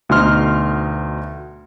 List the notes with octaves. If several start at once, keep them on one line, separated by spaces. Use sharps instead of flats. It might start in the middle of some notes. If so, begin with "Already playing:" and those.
D2 B2 D#4 C6 F6